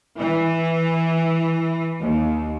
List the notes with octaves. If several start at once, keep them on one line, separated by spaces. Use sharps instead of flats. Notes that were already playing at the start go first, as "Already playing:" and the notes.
E3
D#2